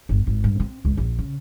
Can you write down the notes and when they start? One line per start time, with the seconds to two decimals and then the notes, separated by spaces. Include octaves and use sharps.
0.09 G1
0.27 G#1
0.44 G2
0.60 C4
0.85 C#2
0.97 A#1
1.19 C#3